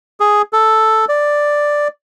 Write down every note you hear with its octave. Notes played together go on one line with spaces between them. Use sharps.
G#4
A4
D5